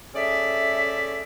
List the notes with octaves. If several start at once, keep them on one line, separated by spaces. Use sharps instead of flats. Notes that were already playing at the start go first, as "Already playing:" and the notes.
A3 C#4 G#4 A4 D5 E5